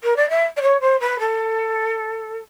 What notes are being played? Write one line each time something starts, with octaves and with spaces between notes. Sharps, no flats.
A#4
D5
E5
D5
C#5
C5
B4
A4